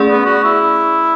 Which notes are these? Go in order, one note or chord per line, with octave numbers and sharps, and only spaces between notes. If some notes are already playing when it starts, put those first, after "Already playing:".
Already playing: A3 C#4 G#4 D5
B3
F#4
E4